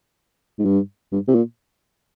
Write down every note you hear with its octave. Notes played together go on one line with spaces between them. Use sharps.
G#2
G2
G2
C3
A#2